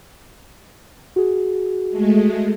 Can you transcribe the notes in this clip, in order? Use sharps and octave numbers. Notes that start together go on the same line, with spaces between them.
F#4 G#4
G#3 A3